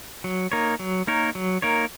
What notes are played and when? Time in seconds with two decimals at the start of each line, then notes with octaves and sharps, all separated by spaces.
0.24 F#3
0.52 A#3 D#4 A#4 C#5
0.80 F#3
1.07 A#3 D#4 A#4 C#5
1.35 F#3
1.62 A#3 D#4 A#4 C#5